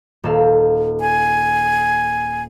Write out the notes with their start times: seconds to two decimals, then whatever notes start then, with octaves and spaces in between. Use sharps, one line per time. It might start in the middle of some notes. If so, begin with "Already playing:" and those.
0.24 D#1 A4 F5
1.01 G#5